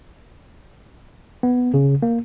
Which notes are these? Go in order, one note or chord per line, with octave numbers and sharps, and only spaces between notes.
B3
C#3
A#3